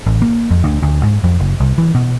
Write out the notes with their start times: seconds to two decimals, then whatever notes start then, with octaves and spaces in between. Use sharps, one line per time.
0.06 A1
0.22 A#3
0.51 F2
0.64 D2
0.83 D2
1.03 G#2
1.24 F2
1.40 F#1
1.60 C2
1.78 E3
1.95 B2